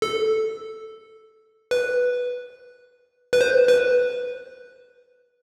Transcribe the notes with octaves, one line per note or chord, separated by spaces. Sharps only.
A4
B4
B4
C5
B4